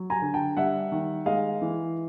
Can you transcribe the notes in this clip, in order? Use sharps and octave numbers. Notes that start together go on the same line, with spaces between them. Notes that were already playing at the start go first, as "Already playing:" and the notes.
Already playing: F#3
G#5 A#5
D3
G5 A5
G3 E5 F#5
D#3
G#3 D#5 F5
E3